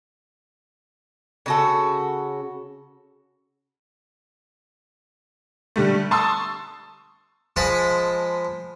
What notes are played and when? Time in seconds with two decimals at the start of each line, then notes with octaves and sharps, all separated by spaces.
1.46 C#3 F#4 A4
5.76 D3 G3 A3
6.11 A5 C6 C#6 D#6 E6
7.56 F3 G#3 A5 B5 D#6